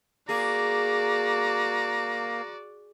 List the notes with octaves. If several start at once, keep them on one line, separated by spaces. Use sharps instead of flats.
A#3 F#4 G#4 D5 A#5